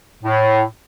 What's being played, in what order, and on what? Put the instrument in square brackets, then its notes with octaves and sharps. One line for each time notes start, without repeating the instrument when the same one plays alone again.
[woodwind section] A2